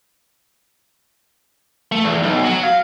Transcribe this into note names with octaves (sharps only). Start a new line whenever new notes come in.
A3
E2
B1
F#3
F5